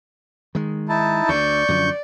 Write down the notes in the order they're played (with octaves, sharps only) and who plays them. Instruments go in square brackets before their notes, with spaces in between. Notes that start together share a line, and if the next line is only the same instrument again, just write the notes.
[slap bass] D#3 G#3
[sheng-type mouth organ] D#4 E4 A5
[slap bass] D2 D3 [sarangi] D5 [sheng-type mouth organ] C#6 G6
[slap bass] F#2 D3 F3